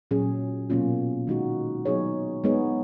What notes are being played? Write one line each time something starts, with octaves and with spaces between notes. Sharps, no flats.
A#2 F#3 C#4 G#4
B2 F#3 A#3 C#4 F4
D#3 G#3 D#4 F#4
F#3 B3 D#4 G#4 C#5
G#3 B3 D#4 G#4 C#5